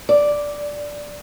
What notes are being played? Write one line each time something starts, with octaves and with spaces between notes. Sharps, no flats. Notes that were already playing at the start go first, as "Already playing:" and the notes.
D5